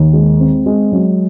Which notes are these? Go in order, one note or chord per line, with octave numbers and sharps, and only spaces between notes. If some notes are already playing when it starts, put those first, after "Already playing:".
Already playing: D#2
G#3
C4
G#3
F#3